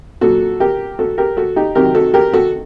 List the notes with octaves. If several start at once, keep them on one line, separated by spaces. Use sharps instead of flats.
A#2 F#3 F#4 A4
G4 A#4
F#4 A4
G4 A#4
F#4 A4
D#4 G4
C3 D#3 F#3 G4 A#4
F#4 A4
G4 A#4
F#4 A4